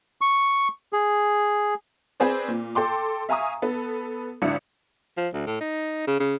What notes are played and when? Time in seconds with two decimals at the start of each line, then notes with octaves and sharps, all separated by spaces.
0.21 C#6
0.93 G#4
2.20 C4 G#4 B4 C5 D5
2.48 A#2
2.75 A4 G5 C6 D6
3.29 E5 F5 G#5 A#5 C#6 D#6
3.62 B3 A4
4.42 G#1 D3 E4 C#7
5.17 F3
5.34 D2
5.46 A2
5.61 D#4
6.07 C#3
6.20 C#3